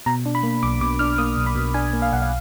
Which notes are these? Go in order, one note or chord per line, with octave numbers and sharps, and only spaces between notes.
B2 A#5
D4
B5
A#3
B1 D6
B2 D6
D4 F6
A#3 D#6
B1
B5
B2
D4 G#5
A#3
F5
B1 F#5
F5